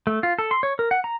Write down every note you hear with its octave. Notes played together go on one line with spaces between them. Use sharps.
A3
F4
A4
C6
C#5
A#4
F#5
A#5